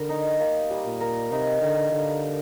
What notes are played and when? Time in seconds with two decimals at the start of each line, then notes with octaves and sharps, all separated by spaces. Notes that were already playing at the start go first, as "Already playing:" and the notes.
Already playing: D3 G3 A#4
0.09 D#4
0.40 A#3
0.70 G3
0.85 A#2
1.01 A#4
1.31 C3 D#4
1.61 D3 D#4
1.92 D3 F5
2.23 A#4